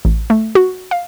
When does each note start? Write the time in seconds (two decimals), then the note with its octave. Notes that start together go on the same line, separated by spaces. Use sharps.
0.05 A1
0.30 A3
0.55 F#4
0.91 F5